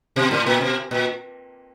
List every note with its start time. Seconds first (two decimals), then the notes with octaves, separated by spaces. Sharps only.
0.16 B2
0.31 A2
0.46 A#2
0.61 B2
0.91 A#2